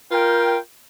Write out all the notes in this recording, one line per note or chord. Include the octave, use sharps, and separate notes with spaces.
F4 A#4 G5